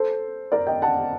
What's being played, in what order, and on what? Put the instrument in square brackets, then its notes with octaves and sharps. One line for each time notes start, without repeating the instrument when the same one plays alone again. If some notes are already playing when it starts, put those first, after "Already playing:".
Already playing: [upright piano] A4 C5
A#4 D5
D#5 G5
F#5 A5